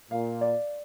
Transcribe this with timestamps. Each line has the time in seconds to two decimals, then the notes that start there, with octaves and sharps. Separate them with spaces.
0.11 A#2 F5
0.41 D5